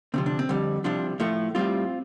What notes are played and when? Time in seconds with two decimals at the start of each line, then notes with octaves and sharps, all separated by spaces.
0.14 D2 C3 F3 C4
0.26 D4
0.39 C4
0.49 F2 D3 G3
0.84 C2 C3 F3 D4
1.20 A2 F3 A3
1.55 A2 G3 C4 F4